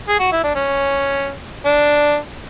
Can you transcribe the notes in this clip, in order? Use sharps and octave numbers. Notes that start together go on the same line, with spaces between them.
G#4
F#4
E4
D4
C#4
D4